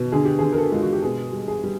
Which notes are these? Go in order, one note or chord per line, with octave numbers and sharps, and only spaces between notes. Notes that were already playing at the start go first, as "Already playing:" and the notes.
Already playing: B2
D3 G#4
G4
D3 G#4
A#4
A4
G#3 F4
F#4
G4
B2 G#4
G3
G#4
G3